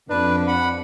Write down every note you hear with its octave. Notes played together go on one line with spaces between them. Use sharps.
F2 D4 B4
F#5 B5